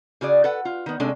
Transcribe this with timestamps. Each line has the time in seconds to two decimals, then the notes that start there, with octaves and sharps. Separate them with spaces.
0.21 C#3 F#4 G#4 D5
0.44 A4 B4 F#5
0.65 F4
0.86 D#3 B3
1.00 C3 G#3 C#4 D4 A4